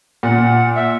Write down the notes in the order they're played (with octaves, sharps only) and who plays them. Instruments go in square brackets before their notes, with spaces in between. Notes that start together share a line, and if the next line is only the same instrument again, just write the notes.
[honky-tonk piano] A#2 [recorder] F#5
[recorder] E5